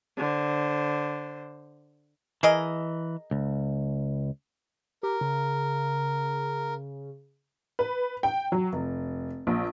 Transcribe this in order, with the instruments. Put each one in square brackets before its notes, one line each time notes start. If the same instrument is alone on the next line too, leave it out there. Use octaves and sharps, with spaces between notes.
[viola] D3 C5
[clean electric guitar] E3 [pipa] G#4 A#4 D#5
[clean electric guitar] C#2
[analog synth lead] G4 [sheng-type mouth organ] A#4
[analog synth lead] C#3
[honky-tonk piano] B4
G5
F#3
F1
A#1